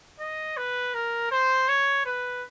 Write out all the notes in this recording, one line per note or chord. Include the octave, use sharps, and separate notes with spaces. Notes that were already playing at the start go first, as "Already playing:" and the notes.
D#5
B4
A#4
C5
C#5
B4